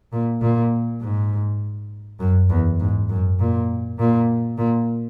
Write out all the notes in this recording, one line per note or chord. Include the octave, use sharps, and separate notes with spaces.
A#2
A#2
G#2
F#2
E2
G#2
F#2
A#2
A#2
A#2